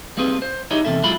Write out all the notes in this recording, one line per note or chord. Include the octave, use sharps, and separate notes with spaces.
G3 A#3 C4 G#4 B4
C5
D#4 E4 G4 G#4 C#5 D#5
E2 C3 A#3 A4 E5
G#2 F#3 E4 F4 G#4 B5